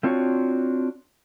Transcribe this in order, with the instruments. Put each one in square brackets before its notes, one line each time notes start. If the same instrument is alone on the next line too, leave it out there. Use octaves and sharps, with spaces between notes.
[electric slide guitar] A3 C4 D4 F4 F#4 C#5